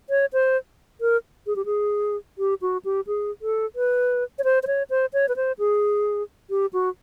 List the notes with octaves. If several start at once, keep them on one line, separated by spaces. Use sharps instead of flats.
C#5
C5
A#4
G#4
G4
G#4
G4
F#4
G4
G#4
A4
B4
C#5
C5
C5
C#5
C5
C#5
B4
C5
G#4
G4
F#4